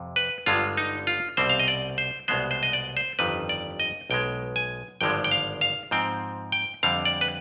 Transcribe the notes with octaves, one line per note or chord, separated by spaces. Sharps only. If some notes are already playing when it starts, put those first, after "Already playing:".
Already playing: F2 C3
B4
G1 G2 D3 G#3 F4
D#4
F4
C2 B2 G3 C4 C5
F5
D#5
D5
C5
C2 B2 G#3 B3 C5
C5
D#5
D5
C5
G1 F2 D#3 G3 B4
D5
D#5
B1 B2 G#3 G5
G#5
G#1 G2 D3 F3 G#3 G5
G5
F5
F5
G#2 F3 C4 G5
G5
F2 D3 G3 F5
D5
B4